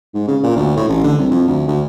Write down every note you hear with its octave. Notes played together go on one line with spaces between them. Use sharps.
G#2
C#3
A#2
D2
A2
A1
D3
C2
F2
D2
D2